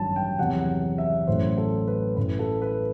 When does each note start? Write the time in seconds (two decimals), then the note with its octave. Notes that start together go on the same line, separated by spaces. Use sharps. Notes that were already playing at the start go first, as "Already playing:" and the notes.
Already playing: A1 G2 D#3 F#3 A5
0.16 G5
0.39 E2 C3 F#3 F#5
0.98 E5
1.27 A1 A2 F#3 C5
1.57 A4
1.88 B4
2.17 A1 A2 E3 B4
2.39 A4
2.62 B4